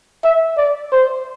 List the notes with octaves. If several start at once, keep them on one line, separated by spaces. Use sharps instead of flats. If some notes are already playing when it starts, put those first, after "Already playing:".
E5
D5
C5